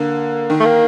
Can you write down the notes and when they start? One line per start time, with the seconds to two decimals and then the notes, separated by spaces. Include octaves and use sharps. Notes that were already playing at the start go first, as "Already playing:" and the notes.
Already playing: D3 A#3
0.50 D#3
0.60 A3
0.65 A#3